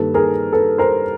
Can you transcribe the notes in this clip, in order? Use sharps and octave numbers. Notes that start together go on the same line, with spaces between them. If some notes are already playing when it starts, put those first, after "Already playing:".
Already playing: G2 D#3 G3 A#3 A4 B4
G#4 A#4
A4 B4
A#4 C5